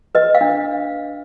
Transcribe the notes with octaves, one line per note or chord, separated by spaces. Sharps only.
B4 D#5
F5
D4